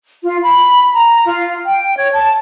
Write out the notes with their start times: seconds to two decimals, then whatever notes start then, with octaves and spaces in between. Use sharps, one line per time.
0.23 F4
0.43 B5
0.93 A#5
1.27 F4
1.66 G5
1.97 C#5
2.13 A5